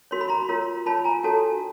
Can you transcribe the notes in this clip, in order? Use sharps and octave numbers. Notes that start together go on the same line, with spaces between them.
F#4 A#4 C#5 C6
B5
A#5 C6
F4 A#4 C#5
F4 A#4 C#5 A5 B5
G#5 A#5
D4 F#4 A4 C#5 G5 A5